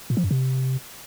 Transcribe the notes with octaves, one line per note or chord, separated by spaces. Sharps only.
A#2
F3
F#2
C3